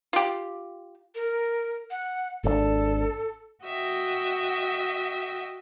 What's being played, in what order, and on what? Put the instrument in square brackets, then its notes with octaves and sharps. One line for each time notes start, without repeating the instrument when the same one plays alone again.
[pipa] F4 G4
[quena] A#4
F#5
[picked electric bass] G#1 C3 D4 [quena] A4
[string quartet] F#4 D#5 E5 G5